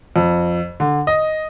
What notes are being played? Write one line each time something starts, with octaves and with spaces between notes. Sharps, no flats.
F2
D3
D#5